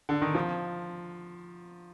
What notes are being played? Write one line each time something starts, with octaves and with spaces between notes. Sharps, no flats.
D3
D#3
F3